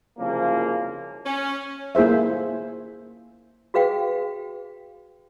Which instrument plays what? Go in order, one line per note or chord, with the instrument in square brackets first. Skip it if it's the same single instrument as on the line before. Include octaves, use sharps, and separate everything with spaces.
[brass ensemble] F#1 C2 C#3 F3 A#3
[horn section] C#4
[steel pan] A#3 E4 G#4 C5 E5
[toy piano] F#4 G#4 B4 F5 G5